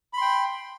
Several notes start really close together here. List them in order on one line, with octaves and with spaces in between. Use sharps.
B5 C6 G5